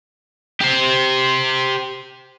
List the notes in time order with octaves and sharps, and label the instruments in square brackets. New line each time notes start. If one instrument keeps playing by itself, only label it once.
[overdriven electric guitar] G4 C5